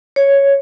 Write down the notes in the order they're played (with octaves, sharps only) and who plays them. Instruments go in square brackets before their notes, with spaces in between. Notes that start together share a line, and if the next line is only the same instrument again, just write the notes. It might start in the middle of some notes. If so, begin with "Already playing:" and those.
[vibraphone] C#5